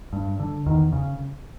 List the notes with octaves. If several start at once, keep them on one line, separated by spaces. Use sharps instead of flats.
G2
D3
E2 D#3
C#3